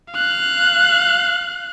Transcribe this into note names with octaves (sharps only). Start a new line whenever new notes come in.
F5 F#6